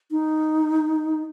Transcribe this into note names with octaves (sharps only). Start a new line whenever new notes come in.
D#4